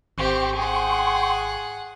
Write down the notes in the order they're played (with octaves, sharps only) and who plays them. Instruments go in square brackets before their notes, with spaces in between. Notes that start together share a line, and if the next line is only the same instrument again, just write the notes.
[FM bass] G#1 [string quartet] C4 G4 [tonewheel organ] G5 C6 C#6
[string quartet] G#4 F#5